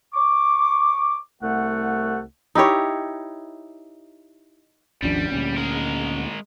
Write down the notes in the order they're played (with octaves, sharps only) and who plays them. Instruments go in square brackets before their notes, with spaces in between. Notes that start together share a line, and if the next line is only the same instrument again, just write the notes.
[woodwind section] C#6 D6
C2 A3 F#5
[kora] D#4 E4 G4 C#5
[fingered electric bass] G#1 D#2 F3 [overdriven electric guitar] G3 [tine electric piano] C#4 D4
[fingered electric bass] D2 A#2 [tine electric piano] C#4
[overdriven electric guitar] G#3 A#4